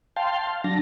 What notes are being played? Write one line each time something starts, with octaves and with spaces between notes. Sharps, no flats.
F5 G5 A5 C6
F5
F#3 D4 A5 A#6